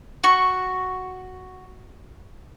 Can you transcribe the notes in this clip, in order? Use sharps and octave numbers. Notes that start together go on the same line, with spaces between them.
F#4 C#6